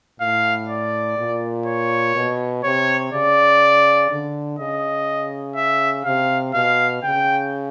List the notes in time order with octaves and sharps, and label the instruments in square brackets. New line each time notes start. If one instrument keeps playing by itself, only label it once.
[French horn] A2 [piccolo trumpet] F5
[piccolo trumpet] D5
[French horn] A#2
[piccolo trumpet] C#5
[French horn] B2
[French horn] C3 [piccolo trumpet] C#5
[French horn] C#3 [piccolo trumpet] D5
[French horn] D3
[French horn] C#3 [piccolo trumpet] D#5
[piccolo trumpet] E5
[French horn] C3 [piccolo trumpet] F5
[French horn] B2 [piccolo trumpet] F5
[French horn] C#3 [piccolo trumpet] G5